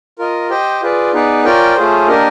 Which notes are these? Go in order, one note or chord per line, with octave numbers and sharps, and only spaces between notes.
F4 A#4 D#5
G4 C5 D#5 G5
F4 G#4 B4 D5
B3 D#4 G#4 B4 D5
C#4 F4 A#4 D5 G5
A3 C#4 F4 G#4 C5
A#3 D4 G4 A#4 D#5